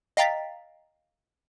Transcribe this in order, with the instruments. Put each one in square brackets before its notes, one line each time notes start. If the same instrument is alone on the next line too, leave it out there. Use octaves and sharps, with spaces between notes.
[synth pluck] D#5 F5 G5 A#5 A6 B6